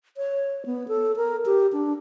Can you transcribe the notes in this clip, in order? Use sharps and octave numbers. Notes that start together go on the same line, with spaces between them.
C#5
B3
A4
A#4
G4
D4